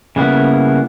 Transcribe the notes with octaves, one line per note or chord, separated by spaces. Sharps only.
C#3 G3 A#3 B3 E4